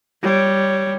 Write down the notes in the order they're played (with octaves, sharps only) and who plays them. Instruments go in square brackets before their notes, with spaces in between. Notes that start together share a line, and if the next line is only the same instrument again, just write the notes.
[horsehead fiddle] G3 C#5